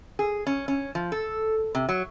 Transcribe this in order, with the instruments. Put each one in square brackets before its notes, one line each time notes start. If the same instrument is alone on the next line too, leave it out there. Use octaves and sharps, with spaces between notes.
[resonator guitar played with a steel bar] G#4
C#4
C#4
F3
A4
C3
F#3